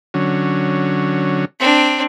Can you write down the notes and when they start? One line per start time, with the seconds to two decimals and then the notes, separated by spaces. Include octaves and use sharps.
0.14 D3 F#3 C#4
1.60 C4 D4